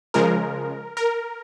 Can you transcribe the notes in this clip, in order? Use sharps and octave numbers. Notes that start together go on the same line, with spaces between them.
C#3 F3 G#3 A#4
A#4